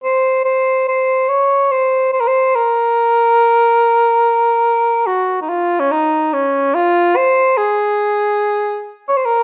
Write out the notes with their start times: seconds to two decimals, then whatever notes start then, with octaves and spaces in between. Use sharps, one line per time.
0.04 C5
0.45 C5
0.88 C5
1.29 C#5
1.71 C5
2.13 C5
2.20 A#4
2.28 C5
2.55 A#4
5.07 F#4
5.42 D#4
5.49 F4
5.80 C#4
5.91 D#4
6.33 C#4
6.75 F4
7.16 C5
7.58 G#4
9.08 C#5
9.17 C5
9.25 A#4